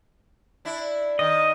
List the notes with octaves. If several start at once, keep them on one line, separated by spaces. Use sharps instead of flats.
D4 E4
D#3 D#5